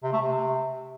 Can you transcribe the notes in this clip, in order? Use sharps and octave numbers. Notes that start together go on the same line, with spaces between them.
C3
A3
C3